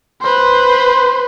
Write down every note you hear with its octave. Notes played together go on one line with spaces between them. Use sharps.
B4 C5